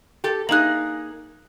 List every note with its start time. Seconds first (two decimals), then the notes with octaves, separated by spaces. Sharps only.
0.24 G4 A4
0.49 A#3 D#4 G#4 F#6 F#7